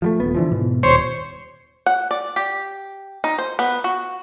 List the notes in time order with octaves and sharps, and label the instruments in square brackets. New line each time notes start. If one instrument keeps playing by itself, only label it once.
[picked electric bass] F3 G3 A3
D#1 C2 B3
D3 E3 F3
G#2 B2
[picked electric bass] D#1 [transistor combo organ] C5 C#5
[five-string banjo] F#5
D5
G4
D#4
C5
B3
F#4